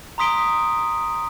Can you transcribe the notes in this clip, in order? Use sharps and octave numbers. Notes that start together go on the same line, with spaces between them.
A#5 C6 D#6 B6 D7 G7